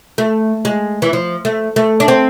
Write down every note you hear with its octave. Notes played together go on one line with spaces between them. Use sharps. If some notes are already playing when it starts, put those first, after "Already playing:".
A3
G#3
E3
F3
A3
A3
D4
C4